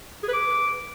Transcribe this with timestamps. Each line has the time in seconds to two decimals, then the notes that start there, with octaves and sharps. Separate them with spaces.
0.23 G#4
0.28 B4
0.33 D6